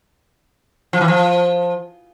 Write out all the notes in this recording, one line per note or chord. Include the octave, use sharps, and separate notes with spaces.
F3
E3
F3